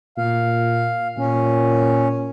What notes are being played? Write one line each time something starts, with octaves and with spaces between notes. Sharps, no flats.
A#2 F5
A#2 C#4